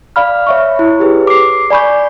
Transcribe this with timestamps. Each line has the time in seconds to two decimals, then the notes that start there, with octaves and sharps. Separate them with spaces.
0.16 D5 F5 B5 F6
0.47 C#5 E5 C#6
0.76 E4 C#5
1.00 G4 G#4 B4
1.27 D6 C7
1.70 D5 G#5 B5 C#6 G6